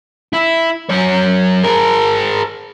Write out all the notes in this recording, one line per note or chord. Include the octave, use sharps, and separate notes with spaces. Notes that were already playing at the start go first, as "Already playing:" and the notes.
E4
F#2 C#5
G#4 A#4